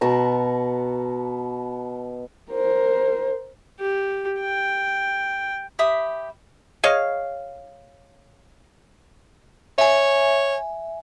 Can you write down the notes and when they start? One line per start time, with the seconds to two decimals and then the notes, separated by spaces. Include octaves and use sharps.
0.01 B2 A5 A#5 C#6
2.52 A#4 C5
3.80 G4
4.41 G5
5.79 G4 E5 B5 D#6
6.84 G#4 C#5 D#5 F5
9.78 C#5 E5 G#5